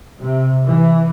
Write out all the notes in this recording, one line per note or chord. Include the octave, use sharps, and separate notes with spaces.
C3
E3